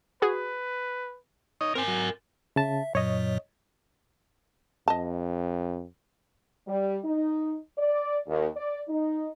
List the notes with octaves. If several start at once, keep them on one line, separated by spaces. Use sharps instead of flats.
F#4 G#4 B4
D#4 C#5 D#5
C4 A#4 G#5
F#3
C#3 E5 A5
F#2 A#2 F#3 C#5 D#5
F2 D#5 A5
G3
D#4
D5
D#2
D5
D#4